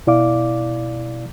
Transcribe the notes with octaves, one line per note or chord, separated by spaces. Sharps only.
B2 E4 D5 F5 D6